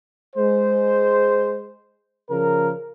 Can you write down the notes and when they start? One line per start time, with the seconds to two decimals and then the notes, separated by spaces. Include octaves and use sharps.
0.36 G#3 C5
2.30 C#3 F3 A#4